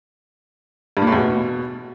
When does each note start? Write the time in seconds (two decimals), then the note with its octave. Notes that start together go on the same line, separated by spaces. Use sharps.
0.97 G2
1.02 A#2
1.07 A2
1.12 E2
1.17 B2